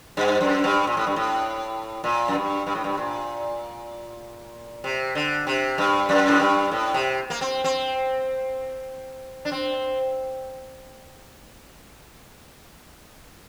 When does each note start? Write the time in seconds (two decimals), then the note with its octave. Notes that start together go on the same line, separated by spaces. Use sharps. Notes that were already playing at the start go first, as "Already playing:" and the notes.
0.17 G2
0.41 F#2
0.64 G2
0.87 A#2
0.97 A2
1.07 G2
1.16 A2
2.04 A#2
2.28 F#2
2.35 G2
2.67 G2
2.75 A2
2.84 G2
2.97 A#2
4.84 C3
5.15 D3
5.47 C3
5.78 G2
6.09 F#2
6.28 A2
6.40 G2
6.71 A2
6.94 C3
7.30 A#3
7.41 C4
7.64 C4
9.45 D4
9.52 C4